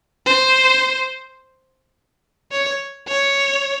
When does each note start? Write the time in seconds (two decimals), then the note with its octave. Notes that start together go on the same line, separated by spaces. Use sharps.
0.26 C5
2.52 C#5
3.08 C#5